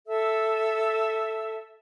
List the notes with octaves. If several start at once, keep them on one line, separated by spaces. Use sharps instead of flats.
A4 E5 E6